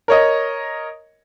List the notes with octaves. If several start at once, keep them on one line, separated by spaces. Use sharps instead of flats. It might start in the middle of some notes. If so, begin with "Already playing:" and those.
A#4 C#5 D#5